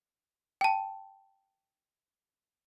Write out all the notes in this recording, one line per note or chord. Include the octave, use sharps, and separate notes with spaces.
G5 A5